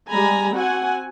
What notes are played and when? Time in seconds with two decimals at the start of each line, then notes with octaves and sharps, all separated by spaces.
0.10 G3 G#3 G#5 A#5 B5
0.54 C4 F#4 F#5 G#5